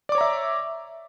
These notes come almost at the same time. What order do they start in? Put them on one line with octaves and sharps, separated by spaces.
D5 D6 C#5 A#5 E5